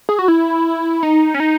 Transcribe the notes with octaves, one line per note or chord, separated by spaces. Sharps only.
G#4
F#4
E4
D#4
C#4
D#4